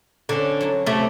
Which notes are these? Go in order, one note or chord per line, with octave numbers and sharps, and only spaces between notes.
D3 C4 C#4 F#4
F#3 E4 F#4
C3 A3